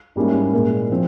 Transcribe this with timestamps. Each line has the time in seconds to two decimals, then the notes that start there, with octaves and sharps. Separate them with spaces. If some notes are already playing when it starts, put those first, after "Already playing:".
0.16 G#2 G3 A#3 C#4 E4
0.53 A#2 G#3 E4 A#4
0.90 F3 C4